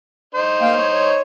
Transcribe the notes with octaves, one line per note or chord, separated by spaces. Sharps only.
D#4 C5
A#3 F5 G5
C#5
C#5